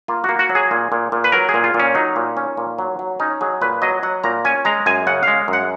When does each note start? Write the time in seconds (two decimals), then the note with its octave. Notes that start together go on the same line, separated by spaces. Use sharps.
0.08 A#3 F4
0.24 A#3 F#4
0.39 F#4
0.49 F#3
0.55 G#4
0.71 A#2
0.92 A#2
1.12 A#2
1.24 B4
1.32 F#3 A#4
1.49 G#4
1.54 A#2
1.64 F4
1.74 A#2
1.79 C#4
1.95 F#3 D#4
2.16 A#2
2.37 C#4
2.57 A#2
2.79 F#3
2.99 F#3
3.20 C#4 D#4
3.41 F#3 G#4
3.61 A#2 B4
3.82 F#3 D#5
4.03 F#3 F#5
4.24 A#2 A#5
4.45 C#4 G#5
4.65 G#3 A#5
4.86 F#2 G#5
5.07 C#3 F#5
5.23 G#3 F5
5.48 F#2
5.53 F#5